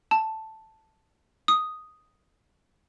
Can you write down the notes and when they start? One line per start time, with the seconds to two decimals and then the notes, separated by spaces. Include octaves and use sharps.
0.11 A5
1.48 D#6